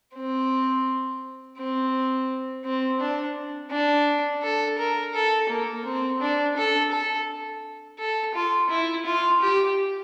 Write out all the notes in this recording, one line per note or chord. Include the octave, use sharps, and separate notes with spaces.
C4
C4
C4
D4
D4
A4
A#4
A4
A#3
C4
D4
A4
A4
A4
F4
E4
F4
G4